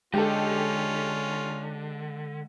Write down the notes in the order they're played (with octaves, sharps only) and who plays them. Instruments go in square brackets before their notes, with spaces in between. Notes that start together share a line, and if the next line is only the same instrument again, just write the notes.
[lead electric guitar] D3 [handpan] G#3 [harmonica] C#4 F4 [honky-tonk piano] G4 A4